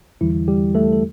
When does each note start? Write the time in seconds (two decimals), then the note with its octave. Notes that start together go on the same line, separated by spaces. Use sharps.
0.21 E2 D3 E3 G3 E4
0.48 G3 G4
0.75 A3 A4
0.93 A4